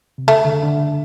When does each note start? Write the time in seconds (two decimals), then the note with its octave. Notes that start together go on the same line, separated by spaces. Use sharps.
0.18 C3
0.27 C#3 A3
0.45 D3
0.63 D3